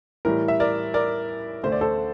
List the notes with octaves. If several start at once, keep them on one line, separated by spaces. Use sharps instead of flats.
A2 E3 G3 A#4
E5
A#4 D5
A#4 D5
D2 D3 A3 C5
D5
A4 C5